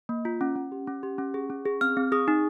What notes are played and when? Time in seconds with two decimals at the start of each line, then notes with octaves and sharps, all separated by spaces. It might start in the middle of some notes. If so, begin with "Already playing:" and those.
0.09 A#3
0.25 F4
0.41 C#4
0.56 C#4
0.72 G4
0.87 C#4
1.03 G4
1.18 C#4
1.34 G#4
1.50 C#4
1.65 G#4
1.81 C4 F6
1.97 C4
2.12 G#4 D#6
2.28 D#4